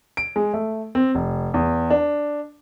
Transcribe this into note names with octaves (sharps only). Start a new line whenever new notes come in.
D7
G#3
A3
C4
F1
E2
D4